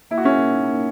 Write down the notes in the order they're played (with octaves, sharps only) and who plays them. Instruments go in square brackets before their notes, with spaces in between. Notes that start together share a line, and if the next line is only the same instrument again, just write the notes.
[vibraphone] A#3 [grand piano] E4
[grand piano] F#4
[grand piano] C#4 E4 [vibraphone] A#4
[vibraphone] D#4
A#3